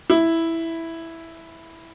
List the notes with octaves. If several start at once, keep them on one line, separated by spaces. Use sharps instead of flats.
E4